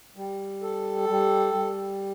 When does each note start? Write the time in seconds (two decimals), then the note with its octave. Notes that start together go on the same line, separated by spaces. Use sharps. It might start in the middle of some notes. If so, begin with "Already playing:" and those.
0.16 G3
0.62 A4
1.09 G3
1.54 G3